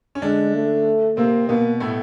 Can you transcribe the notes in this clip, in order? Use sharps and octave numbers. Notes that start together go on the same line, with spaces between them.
C#4
D3 G#3 D4
A3
C3 A#3 C4
B2 A#3 B3
A2 A3